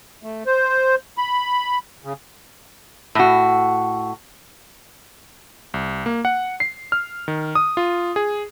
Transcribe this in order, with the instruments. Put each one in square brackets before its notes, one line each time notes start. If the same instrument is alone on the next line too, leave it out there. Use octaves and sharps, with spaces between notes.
[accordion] A3
C5
B5
C#3
[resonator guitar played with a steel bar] A2 F#4
[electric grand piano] C2
A#3
F#5
C7
F6
D#3
D#6
F4
G#4